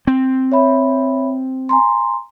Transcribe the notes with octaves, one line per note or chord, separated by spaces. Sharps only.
C4
C#5 E5 B5
G#5 A#5 C6